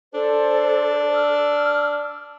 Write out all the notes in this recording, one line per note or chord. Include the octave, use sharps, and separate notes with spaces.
D4 A4 C5
E6 F6